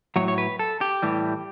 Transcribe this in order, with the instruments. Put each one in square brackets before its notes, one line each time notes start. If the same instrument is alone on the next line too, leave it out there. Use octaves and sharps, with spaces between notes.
[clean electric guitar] A2 F#3 C#5
C#5
B4
A4
G4
A2 E3 G3